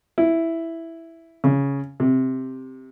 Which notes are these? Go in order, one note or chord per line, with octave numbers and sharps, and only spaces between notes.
E4
C#3
C3